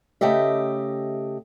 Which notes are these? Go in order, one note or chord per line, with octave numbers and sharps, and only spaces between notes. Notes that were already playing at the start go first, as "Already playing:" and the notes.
C#3 A3 G4 D#5 E5